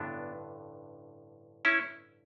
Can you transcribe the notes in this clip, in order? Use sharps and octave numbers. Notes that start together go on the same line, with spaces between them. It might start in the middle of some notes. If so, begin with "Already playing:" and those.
Already playing: A1 G2 D3 B3 D4
C#4 E4